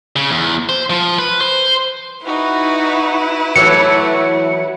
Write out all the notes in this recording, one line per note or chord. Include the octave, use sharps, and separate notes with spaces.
C#3
E2
C5
F3
B4
C5
D#4 E4 F#4 B4
E3 F#3 A3 C#7